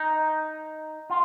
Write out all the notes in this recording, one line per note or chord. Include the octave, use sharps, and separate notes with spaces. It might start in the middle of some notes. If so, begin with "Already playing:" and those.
Already playing: D#4
F4